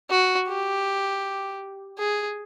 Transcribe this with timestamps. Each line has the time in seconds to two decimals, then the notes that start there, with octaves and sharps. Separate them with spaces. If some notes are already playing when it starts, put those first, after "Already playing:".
0.10 F#4
0.48 G4
1.99 G#4